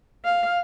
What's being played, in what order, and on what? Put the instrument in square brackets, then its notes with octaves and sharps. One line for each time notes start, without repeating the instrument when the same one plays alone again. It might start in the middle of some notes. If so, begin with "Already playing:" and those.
[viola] F5